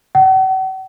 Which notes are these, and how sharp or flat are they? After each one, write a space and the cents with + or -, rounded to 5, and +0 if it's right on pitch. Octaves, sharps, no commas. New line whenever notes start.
F#5 +40